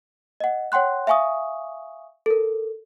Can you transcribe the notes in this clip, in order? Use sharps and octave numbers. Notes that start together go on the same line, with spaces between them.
D#5 F#5
C#5 F#5 G5 C6 F#6
E5 F5 G#5 C#6 D#6
A4 A#4